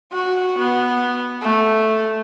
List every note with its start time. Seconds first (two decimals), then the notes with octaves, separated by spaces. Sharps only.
0.12 F#4
0.58 B3
1.41 A3